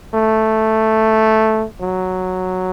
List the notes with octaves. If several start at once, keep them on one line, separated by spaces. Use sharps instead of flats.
A3
F#3